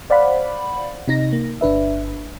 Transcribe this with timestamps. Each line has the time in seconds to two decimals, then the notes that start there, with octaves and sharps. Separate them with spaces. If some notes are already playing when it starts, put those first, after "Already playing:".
0.10 C5 D5 F5 F#5 B5
1.08 C3 D#4 A#6
1.33 A#3
1.61 G1 D4 B4 E5